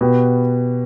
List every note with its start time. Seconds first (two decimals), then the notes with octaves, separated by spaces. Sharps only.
0.01 B2 B3 G4 B4